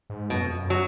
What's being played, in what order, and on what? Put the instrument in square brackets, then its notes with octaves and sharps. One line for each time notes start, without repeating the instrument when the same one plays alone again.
[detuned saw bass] G#2
[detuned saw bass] F#2 [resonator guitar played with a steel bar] B2
[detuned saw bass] F2
F#2
[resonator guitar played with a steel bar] F#3